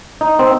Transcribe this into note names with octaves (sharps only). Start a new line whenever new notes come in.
D#4
C4